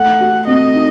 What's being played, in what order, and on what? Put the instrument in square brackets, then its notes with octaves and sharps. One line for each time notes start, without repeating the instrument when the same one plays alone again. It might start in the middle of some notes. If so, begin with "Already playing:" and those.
Already playing: [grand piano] A3 A4 [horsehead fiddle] F#5
[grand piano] F#4
[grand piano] C4 [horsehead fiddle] D#5
[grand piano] D#4